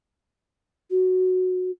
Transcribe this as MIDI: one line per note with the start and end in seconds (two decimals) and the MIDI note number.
0.90 1.71 66